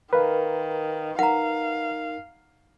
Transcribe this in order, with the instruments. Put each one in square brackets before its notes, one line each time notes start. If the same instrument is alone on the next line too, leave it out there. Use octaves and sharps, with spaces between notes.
[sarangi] D#3 [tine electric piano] A#4 F5 [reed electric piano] B4
[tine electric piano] D#4 A#4 [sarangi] F5 [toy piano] F#5 A#5